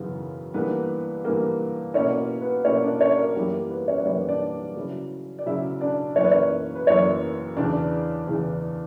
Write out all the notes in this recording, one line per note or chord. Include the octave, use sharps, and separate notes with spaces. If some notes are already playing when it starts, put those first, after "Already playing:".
Already playing: F#2 C#3 E3 B3
G2 E3 A#3 B3 B4
G2 E3 A#3
B2 A#3 C#4 E4 C#5
B3 B4
B2 A#3 C#4 E4 C#5
D4 D5
C#4 C#5
A#4
F#2 E3 G3 A#3 E4 G4
A#4
B3 B4
C#4 C#5
B4
F#2 E3 G3 A#3 C#4 E4 C#5
D4 D5
C#3 F#3 C#4 E4
D5
C#3 F#3 C#4 E4 E5
D4 D5
F#2 E3 A#3 C#5
B4
C#4 C#5
B4
F#2 E3 A#3 C#4 C#5
E2 C#3 E3 D4 D5
E2 C#3 E3